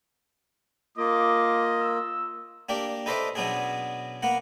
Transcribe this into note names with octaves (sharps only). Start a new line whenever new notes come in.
A#3 F4 D#5 D6
E6
A#3 D4 G4 D5
D#4 A4 B4 C5 D5 E5
B2 F#3 B3 C#4 D4 G#4
A#3 B3 F#5